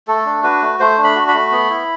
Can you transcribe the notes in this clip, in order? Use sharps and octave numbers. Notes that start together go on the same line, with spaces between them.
A3 A4
D4
F#4 B4
A3
A3 C5
D4
B5
F#4
B5
A3
B3
E4